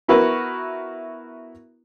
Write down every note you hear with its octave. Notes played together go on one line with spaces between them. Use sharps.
B3 E4 F#4 A#4 B4 E5